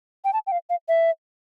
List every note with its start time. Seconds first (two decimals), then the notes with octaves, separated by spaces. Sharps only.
0.24 G5
0.33 A5
0.47 G5
0.52 F5
0.70 F5
0.88 E5